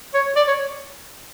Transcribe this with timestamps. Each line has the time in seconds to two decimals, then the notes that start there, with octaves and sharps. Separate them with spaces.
0.14 C#5
0.36 D5
0.48 C#5